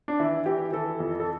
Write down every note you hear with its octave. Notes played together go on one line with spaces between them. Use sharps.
D4
E3 E4
E3 G4
E3 A4
F2
A4